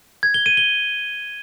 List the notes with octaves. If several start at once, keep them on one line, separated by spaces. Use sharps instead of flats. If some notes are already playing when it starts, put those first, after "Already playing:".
G#6
G7
D#7
G7